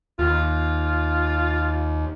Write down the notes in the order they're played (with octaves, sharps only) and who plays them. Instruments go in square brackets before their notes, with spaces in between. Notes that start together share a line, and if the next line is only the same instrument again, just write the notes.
[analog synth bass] D#2 [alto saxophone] F4